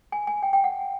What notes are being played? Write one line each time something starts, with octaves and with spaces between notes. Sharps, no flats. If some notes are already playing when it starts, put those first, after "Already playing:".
G#5
G#5
G5
G5
F#5